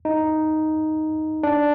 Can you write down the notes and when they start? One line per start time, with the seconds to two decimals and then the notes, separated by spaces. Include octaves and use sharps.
0.05 D#4
1.43 D4